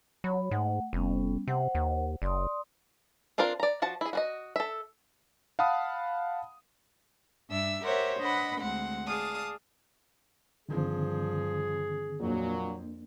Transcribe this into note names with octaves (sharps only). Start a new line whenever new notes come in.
F#3 C#5 B5
G#2 A3 F#5
F1 G3 B3 C#4
C3 C5 F#5
D#2
F#1 D5 C6 D#6
C4 D4 F4 A#4 C5
D5 A#5
F3 F#4 A5
E4 G#4
F#4 G#4 D#5
A4 E5
F5 F#5 A5 B5 D#6
G2 D4 E5 E6
G4 A#4 C5 C#5 E5 F#5
D4 B4 D#5 F#5 B5
D2 G#3 C4 F#5
G#4 D5 F5 A5 D#6
G2 D3 D#3 F3 C4 G#4
F2 A#2 F#3 A#3 D4